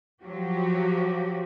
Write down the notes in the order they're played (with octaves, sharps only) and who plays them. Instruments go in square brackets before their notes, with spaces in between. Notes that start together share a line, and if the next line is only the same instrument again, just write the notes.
[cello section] F3 F#3 F#4 G4